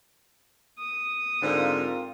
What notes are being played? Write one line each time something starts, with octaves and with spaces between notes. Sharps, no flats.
D#6
G#2 D3 C4 F4 A#4